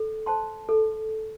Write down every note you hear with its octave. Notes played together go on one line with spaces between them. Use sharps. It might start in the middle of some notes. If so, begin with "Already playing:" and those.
Already playing: A4
C5 A5 C6
A4